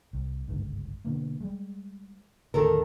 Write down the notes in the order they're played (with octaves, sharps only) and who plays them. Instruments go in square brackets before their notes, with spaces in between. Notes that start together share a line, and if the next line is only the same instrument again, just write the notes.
[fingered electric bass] C2
G1 C#2 G#2
B2 D3 A#3
G3 G#3
[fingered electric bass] D#2 A2 D3 [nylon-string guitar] D#3 A4 A#4